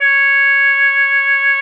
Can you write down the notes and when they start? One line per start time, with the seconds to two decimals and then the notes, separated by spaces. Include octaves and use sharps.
0.01 C#5